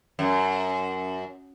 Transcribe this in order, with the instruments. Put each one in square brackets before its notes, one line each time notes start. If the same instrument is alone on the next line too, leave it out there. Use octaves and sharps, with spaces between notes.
[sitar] F#2